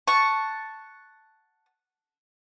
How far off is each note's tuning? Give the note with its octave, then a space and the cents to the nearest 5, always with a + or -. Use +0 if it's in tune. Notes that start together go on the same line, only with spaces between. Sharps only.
F#5 +0 A5 +0 C#6 +0